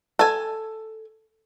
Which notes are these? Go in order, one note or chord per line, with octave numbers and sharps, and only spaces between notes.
A4 G#5